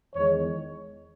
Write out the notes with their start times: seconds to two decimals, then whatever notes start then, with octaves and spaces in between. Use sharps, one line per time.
0.15 E2 D#3 G#3 C#5